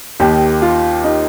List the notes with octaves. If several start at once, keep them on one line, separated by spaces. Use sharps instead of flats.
D#2 D#3 G4
F4
D#4